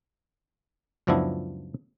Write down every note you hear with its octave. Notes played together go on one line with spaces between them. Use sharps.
C#2 F#2 F3 B3 D4 E4